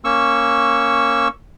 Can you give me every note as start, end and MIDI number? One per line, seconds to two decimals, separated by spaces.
0.04 1.28 58
0.04 1.28 61
0.04 1.28 85
0.04 1.28 88